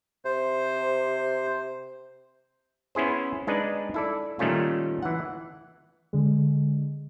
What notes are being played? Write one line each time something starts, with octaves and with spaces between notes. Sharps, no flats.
C3 C5
B3 C#4 E4 G#4 C5
G#3 D4 D#4 B4 D5
E4 A4 D5
A#2 D#3 G3 A3 C#4 F4
E3 F#5
D3 G#3